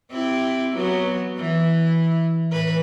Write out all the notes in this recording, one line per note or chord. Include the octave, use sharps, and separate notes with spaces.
C4 E4 G4
F#3 B3 F#4
E3 E4
A2 E3 B4